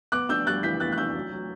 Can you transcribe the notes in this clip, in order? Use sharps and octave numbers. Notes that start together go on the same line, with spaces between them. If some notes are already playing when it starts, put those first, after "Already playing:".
B3 D6 F#6
D4 E6 G6
G3 F#6 A6
E3 G6 B6
B3 F#6 A6
F#6
D4 E6 G6
F#3
F#3